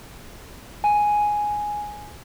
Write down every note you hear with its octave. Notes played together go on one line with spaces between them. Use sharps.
G#5